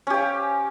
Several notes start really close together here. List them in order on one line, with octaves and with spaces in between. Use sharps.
C#4 G4 F5